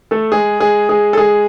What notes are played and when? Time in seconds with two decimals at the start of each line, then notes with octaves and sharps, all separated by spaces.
0.11 A3 A4
0.32 G#3 G#4
0.60 G#3 G#4
0.89 G#3 G#4
1.13 A4
1.18 G#3 G#4